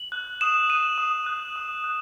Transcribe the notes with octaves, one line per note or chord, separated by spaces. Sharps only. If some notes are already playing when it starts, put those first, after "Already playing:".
Already playing: F#7
F#6
D#6 E7
F#6 D#7
D#6
F#6
D#6
F#6